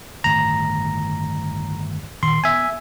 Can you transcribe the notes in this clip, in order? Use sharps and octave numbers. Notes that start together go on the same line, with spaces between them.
G1 D#2 A2 A#5
A#2 D#3 C6
B3 E5 G#5